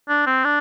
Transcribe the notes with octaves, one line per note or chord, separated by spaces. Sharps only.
D4
C4
D4